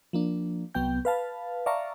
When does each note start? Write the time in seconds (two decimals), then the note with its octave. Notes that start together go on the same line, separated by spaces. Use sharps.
0.13 F3 A#3 D4
0.75 C2 F#3 B3 G5 G6
1.05 B4 F5 A5
1.66 D5 E5 F5 A5 A#5 C#6